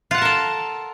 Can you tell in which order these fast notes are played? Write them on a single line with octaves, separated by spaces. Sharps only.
F4 F#5 A5 A#4 A4